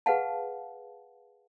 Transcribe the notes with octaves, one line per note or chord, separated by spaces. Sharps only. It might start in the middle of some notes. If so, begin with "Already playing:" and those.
G#4 B4 F5 F#5 A5